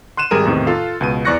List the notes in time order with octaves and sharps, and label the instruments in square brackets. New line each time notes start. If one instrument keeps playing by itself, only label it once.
[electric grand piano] C6 F#6 D#7 E7
G#1 G3 G#4 A#4 D#7
E2 A2 C3 D#3
F4 A4 F5
C#2 B2 D#7
E2 D5 C#6 F#6 A#6 C#7